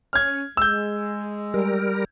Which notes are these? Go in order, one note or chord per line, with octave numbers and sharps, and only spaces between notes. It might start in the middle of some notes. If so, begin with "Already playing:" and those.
C#4 F6 G#6
G#3 E6 G6
G3 A#4